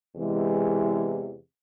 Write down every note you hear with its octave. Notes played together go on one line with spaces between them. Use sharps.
E2 C3 E3 G#3